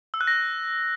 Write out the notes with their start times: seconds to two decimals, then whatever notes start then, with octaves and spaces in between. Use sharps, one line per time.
0.14 E6
0.21 F#6
0.27 A#6